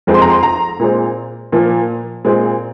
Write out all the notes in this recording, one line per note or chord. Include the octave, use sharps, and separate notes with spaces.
F2 F3 G#3 C4
C6
A#5
C6
A#5
A#2 G#3 C4
A#2 F3 A#3
A#2 G#3 C4